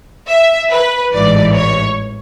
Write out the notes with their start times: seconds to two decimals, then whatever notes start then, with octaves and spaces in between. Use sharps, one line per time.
0.27 E5
0.69 B4
1.12 A1 G#2 E3 D5
1.54 C#5